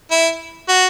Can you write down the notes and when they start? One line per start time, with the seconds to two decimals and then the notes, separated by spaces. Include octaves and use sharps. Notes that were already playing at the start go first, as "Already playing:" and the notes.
0.11 E4
0.69 F#4